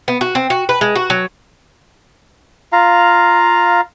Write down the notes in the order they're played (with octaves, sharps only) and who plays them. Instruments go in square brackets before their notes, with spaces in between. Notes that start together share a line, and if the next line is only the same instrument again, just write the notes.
[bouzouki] B3
F#4
C4
F#4
B4
G#3
F#4
F#3
[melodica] F4 F5 A#5